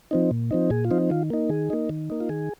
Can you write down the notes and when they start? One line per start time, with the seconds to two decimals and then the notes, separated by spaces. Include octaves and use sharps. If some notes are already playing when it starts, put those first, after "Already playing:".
0.11 F3 C4 D#4
0.31 A#2
0.51 F3 C4 D#4
0.70 A#2 G#4
0.85 F4
0.91 F3 C4 D#4
1.10 D#3 F4
1.30 A#3 D#4
1.49 D#3 G#4
1.70 A#3 D#4
1.89 D#3
2.10 A#3 D#4
2.20 F4
2.29 D#3 G#4